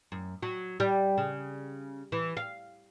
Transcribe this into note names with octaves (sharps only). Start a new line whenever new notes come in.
F#2
F#3
G3
C#3
E3
F5